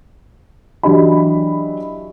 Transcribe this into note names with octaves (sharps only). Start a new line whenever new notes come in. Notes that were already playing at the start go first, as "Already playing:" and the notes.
E3 F#3 D4 G4 D#5 B5